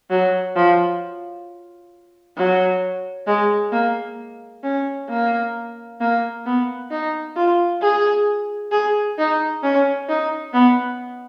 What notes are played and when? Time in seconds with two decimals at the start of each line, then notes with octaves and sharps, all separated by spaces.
0.10 F#3
0.56 F3
2.37 F#3
3.27 G#3
3.72 A#3
4.63 C#4
5.09 A#3
6.00 A#3
6.45 B3
6.91 D#4
7.36 F4
7.81 G#4
8.72 G#4
9.18 D#4
9.63 C#4
10.09 D#4
10.53 B3